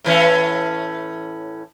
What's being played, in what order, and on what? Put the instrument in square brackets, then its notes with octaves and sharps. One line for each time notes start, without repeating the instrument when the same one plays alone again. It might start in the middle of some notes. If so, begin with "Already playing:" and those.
[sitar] A2 E3 C#4